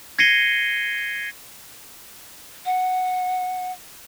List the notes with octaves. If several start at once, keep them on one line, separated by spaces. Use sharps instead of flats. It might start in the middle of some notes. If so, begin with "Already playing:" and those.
G#6 A#6 C7 C#7 D#7 G7
F#5